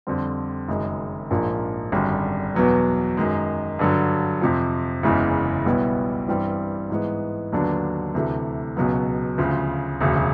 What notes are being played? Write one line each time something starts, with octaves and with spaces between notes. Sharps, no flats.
F2 D3 G3 C4
F#1 F#2 D#3 G#3
A#1 G#2 F3 A#3 D4
G#1 F#2 D3 G3
E2 B2 F#3 B3
F#2 D#3 G#3
G2 D3 F#3
F2 C3 F3
F#1 E2 C#3 E3 G#3
B1 B2 G3 B3 E4
G2 E3 G3 C4
G#2 E3 G#3 B3
D#2 D3 F#3 B3 D4
D2 C3 E3 A3
C#2 B2 F#3 B3
D2 C#3 F3
E1 D2 C#3